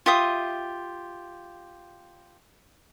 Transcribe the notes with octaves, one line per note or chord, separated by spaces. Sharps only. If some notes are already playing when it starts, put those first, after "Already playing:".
F4 G4 E5 D#6